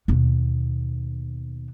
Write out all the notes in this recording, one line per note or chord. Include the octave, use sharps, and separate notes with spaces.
D#2 B2